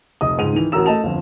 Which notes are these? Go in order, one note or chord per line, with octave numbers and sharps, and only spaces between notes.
F1 D#5 D#6
C#2 G#2 D#7 F7
D#3 E3 F7
A1 F#4 A#4 A#5 E6 E7
A3 D#5 A5 F7
G1 F2